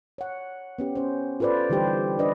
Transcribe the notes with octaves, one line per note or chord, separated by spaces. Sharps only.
C#5 F#5
B3 C#4 G4
C#4 C5
F4 A4 B4 C5 D5
D3 E3 G3 D#4 G4 C5
D4 B4 D5 D#5